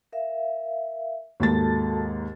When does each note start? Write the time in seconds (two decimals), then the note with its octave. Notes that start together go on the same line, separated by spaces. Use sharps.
0.12 A#4 E5 F5
1.40 D#2 G#2 F#4 A4 A5 A6